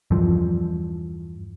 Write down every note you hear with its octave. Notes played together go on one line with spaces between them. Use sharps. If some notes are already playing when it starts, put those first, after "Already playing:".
E2 G2 E3 F3